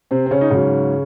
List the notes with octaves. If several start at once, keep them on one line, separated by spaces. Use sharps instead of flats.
C3 C4
C4
C#3 C#4
D#4
G#2 C#3 F#3 C#4